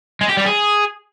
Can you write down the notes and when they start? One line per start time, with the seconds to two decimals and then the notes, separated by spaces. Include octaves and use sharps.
0.21 G#3
0.29 G4
0.37 G3
0.45 G#4